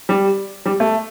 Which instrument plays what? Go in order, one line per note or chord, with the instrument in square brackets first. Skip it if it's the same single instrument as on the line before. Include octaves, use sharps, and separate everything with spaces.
[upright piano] G3
G3
A3